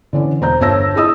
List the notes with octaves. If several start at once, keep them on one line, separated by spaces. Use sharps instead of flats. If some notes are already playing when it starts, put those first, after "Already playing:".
D3 E3 C#4 D4
E1 C5 A#5 G6
G1 C#5 A5 E6 A#6
E4 G#4 D#5 D#6 E6